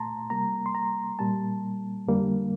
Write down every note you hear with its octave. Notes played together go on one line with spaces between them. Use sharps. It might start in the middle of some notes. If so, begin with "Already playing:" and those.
Already playing: A#2 A3 A5 A#5 C6
C3 G3 A#3 A#5
C6
A#5
A#2 G3 A#3 A5
F2 D3 G3 A#3